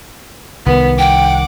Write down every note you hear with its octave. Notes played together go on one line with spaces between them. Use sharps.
C2 D#3 B3
F#5 G5 D6